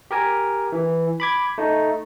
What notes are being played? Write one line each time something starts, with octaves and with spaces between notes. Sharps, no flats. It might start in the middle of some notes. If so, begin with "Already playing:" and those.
G4 A#4 G#5
E3
B5 D6 G#6
A3 D#4